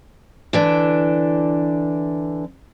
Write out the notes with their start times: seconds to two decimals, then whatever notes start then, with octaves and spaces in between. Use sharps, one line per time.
0.53 D3 E3 D4